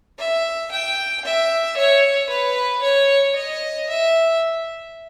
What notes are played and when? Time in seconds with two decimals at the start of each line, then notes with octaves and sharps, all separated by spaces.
0.19 E5
0.71 G5
1.24 E5
1.77 C#5
2.29 B4
2.82 C#5
3.36 D#5
3.89 E5